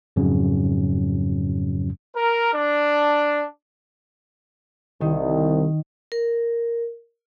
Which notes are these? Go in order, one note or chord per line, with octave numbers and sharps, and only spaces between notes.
F2 G#2 C#3 F#3 C#4
A#4
D4
C2 D#3
A#4